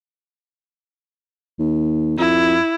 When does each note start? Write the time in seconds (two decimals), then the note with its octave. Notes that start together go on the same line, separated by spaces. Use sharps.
1.59 D#2
2.18 F2 E4